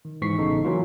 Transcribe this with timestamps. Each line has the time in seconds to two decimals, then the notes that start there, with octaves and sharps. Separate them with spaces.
0.05 D#3
0.22 G#2 E3 C#6 B6 C7
0.38 A1 A2 C#3 B3 D#4 A4
0.64 E3 F#3 A#3 F4